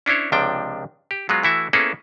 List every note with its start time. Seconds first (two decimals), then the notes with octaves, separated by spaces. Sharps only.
0.06 C#4 D4 E4 C5 C#5
0.32 C#2 C3 F3 D4 G5
1.11 G4
1.29 F#3 G#3 B3 F4
1.43 E3 A3 E4 F#4 E5
1.73 A#3 B3 C#4 E4 G#4 A4